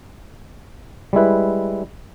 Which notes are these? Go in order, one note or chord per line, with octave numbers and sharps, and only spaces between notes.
G3 G#3 E4 B4